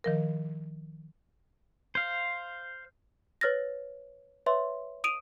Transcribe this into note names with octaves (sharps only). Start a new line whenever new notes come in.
D#3 F3 A#4
C5 F5
B4 C#5 F6 A6 A#6
B4 C#5 E5 C6
D#6 D7 D#7 F7